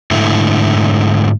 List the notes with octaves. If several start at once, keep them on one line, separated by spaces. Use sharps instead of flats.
G#2 D3 A3 E4